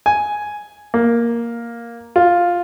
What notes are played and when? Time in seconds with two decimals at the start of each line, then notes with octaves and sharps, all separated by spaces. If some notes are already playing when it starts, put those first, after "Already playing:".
0.06 G#5
0.94 A#3
2.16 F4